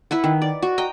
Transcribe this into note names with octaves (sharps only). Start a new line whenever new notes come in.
E4 B4 F#5
D#3
D5
F#4
D#5 G5 A#5